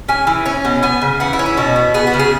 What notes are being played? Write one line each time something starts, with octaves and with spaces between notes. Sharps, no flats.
C#4 G#5
E3
C#4
B2
B3 G#5
C#3
E3 F#5
E4
C#4
E4
B2 F#4
B3
B3 G#4
F#4
C#3
G#4